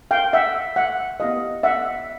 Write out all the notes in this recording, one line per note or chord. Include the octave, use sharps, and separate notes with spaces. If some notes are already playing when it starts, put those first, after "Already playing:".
F5 G5
E5 F#5
E5 F#5
B3 E4 G4 D#5 F5
E5 F#5